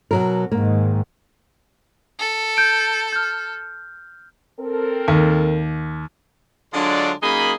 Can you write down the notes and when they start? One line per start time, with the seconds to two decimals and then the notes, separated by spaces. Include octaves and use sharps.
0.11 B2 F#3 A#4
0.51 G#2 D#3 A#3
2.19 A4
2.57 G6 D7
3.13 F6 G6
4.59 C4 A4 A#4
5.08 D#2
6.74 D3 F#3 G#3 D4 F4 D5
7.22 F#2 A#3 D#4 G#4 B5